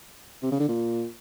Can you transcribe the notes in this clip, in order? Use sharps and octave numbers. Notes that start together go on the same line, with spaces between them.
C3
C#3
D3
A#2